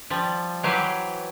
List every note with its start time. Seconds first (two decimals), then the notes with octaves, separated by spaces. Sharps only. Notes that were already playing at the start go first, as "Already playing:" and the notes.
0.10 F3 G3
0.63 E3 F#3 G4 B4 C5